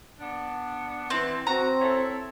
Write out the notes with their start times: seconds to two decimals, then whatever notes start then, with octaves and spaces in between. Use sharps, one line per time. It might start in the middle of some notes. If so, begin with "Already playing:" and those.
0.20 B3 D4
1.10 E3 C4
1.47 C4 F#4 A#5
1.82 E4 A4 C#5